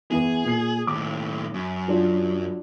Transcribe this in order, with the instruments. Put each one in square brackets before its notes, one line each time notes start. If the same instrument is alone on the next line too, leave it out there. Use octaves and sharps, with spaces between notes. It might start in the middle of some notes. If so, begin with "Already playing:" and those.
[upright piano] E2 E3 B3 [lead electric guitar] G#4
[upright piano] A#2 C7
[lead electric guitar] D#2 A2 [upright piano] D6
[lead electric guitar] F#2
[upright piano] F#3 D4 F4